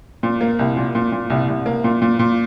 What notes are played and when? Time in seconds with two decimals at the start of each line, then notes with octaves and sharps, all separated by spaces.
0.23 A#2
0.41 A#3
0.59 C2
0.76 A#2
0.95 A#2
1.12 A#2
1.30 C2
1.48 C2
1.66 A#3
1.84 A#2
2.02 A#2
2.19 A#2